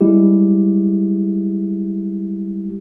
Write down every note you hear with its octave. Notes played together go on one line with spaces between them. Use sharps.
G3 G#3 E4 G4